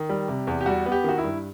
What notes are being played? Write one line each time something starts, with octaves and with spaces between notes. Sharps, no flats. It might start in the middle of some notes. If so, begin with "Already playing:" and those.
Already playing: D#3
G3
C3
E2
G4
G3 F#4
B3
G4
D#3 F#4
E4
G2